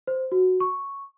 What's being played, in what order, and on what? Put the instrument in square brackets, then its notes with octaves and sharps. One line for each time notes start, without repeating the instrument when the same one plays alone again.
[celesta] C5
F#4
C#6